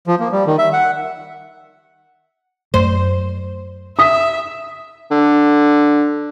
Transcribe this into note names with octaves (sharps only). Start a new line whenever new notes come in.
F3
A#3
G3
D#3
E5
F#5
F#2 A3 C5
E5 D#6 B6
D3